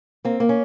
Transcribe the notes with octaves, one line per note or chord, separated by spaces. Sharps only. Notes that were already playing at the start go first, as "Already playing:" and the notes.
A#3 C4
A#3
C#4